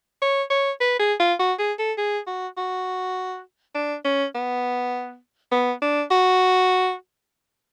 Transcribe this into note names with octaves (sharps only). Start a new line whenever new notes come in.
C#5
C#5
B4
G#4
F4
F#4
G#4
A4
G#4
F#4
F#4
D4
C#4
B3
B3
D4
F#4